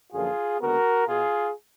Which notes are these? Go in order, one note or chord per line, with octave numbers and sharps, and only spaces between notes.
F#2 D3 F3 A#3 F4 G#4
D#2 D3 G#3 B3 F#4 A#4
B2 F4 G#4